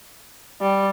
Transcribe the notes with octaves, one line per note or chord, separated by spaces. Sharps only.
G3